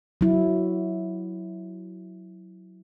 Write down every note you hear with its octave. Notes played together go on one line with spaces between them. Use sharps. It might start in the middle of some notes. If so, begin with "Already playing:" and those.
F#3 E4